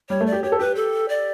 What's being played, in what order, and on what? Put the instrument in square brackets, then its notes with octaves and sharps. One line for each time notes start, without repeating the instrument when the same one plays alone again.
[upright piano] G3 [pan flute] C#5
[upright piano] A3
[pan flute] D5
[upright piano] G4
[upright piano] G4 [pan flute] C#5
[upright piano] A4
[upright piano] G4 [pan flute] B4
[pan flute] A4
D5